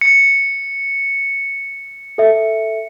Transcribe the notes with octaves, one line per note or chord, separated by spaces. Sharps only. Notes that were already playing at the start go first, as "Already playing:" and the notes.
C#7
A4 E5